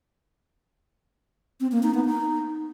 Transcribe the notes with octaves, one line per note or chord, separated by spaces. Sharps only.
C4
A#3
D#4
B3
D#4